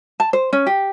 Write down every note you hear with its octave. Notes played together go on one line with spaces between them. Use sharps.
A5
C5
C#4
G4